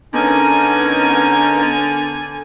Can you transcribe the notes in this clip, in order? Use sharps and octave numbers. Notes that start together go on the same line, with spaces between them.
D3 B3 C#4 D#4 A#4 G#5